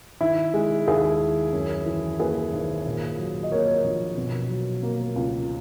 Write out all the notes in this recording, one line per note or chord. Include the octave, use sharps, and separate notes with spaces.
D#3 E4
G#3
D#2 E4 G#4
D#2
F#2
E3
A#3 G#4 B4
G#1
A#2
F#3
D#5
A#3 A#4 C#5
A#1
B2
F#3
A#3
C#2